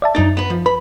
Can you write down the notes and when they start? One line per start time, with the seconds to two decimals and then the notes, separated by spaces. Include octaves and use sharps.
0.02 D5 E5 A5
0.15 F#2 D4 D#4 A6
0.37 B3 B4
0.50 F3
0.66 B4 B5